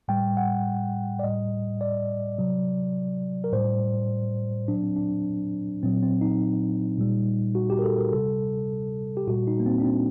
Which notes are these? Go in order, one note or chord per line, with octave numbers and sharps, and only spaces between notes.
A2 G3 G5
F#5
D5
A2 G3 D#5
D5
C3 F#3
A#4
A2 G3 C5
A#2 F#3 D4
C4
D4
A#2 F#3 C4
C4
D#4
A#2 G3
F#4
G4
A#4
A4
A#4
C3 G3 A4
G4
A#2 G3 F#4
D#4
A#3
C4
D4
C4